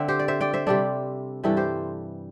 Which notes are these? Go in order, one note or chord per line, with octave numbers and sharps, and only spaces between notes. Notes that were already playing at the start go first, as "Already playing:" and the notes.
Already playing: D3 C4 E5 G5
G4 C5
D5
C5 E5
D5 G5
C5 E5
C3 G3 D4 A4 D5
G2 E3 G3 E4 A4
G4 C5